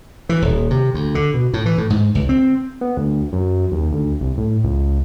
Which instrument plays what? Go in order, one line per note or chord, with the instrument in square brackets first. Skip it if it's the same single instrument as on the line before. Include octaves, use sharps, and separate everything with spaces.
[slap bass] E3
D#1
C3
D2
D3
B2
A2
E3
A2
G#2
C#2
C4
[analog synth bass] B3
D2
F#2
D#2
D2
C2
A2
C#2